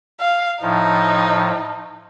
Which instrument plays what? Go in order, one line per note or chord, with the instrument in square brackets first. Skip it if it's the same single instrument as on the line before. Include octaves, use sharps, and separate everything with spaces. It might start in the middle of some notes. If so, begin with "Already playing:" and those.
[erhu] F5
[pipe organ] A2 F3 [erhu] D#4